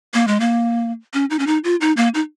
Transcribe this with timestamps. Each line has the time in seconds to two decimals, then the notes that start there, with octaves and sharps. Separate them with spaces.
0.14 A#3
0.27 G#3
0.40 A#3
1.14 C#4
1.30 D#4
1.39 C#4
1.47 D#4
1.64 F4
1.81 D#4
1.97 A#3
2.14 D#4